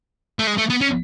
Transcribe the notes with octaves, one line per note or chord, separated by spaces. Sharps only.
A3
G#3
A3
B3
C#4